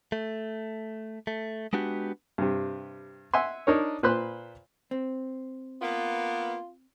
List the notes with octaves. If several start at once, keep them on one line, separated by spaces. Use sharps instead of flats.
A3
A3
G#3 B3 D4 F#4 G4
G2 C3
E5 F#5 G#5 C6
D4 D#4 A#4 C#5
A#2 B4 C5 B5 C6 F#6
C4
A#3 B3 F4